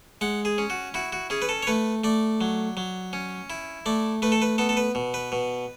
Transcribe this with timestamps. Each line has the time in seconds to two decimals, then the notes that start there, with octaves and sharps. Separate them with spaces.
0.21 G#3 F#5
0.45 G#4
0.58 C#4
0.70 F#4
0.94 E4 F#4
1.13 F#4
1.30 C#4 G#4
1.42 B4
1.49 A4
1.63 C#5
1.67 A3 B4
2.04 A3 D5
2.41 F#3
2.77 F#3
3.13 C#4
3.50 E4
3.86 A3 D5
4.22 A3 B4
4.32 A4
4.42 B4
4.58 B3 A4
4.69 A4
4.77 B4
4.95 B2
5.14 B4
5.32 B2